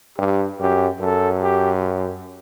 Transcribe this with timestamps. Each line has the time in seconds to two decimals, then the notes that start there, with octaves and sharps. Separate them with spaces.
0.18 G2 G4
0.60 F#2 G4
1.01 F#2 A4
1.42 G4